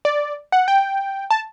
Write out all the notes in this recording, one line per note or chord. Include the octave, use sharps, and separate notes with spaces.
D5
F#5
G5
A5